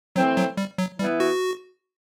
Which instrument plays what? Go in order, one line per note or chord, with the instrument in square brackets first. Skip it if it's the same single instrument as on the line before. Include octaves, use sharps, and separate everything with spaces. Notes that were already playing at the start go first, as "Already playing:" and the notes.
[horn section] E3 A3 C4 [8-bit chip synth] F#3
[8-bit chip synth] F#3
G3
F#3
[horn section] E3 B3 E4 [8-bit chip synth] G3
[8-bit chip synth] F#4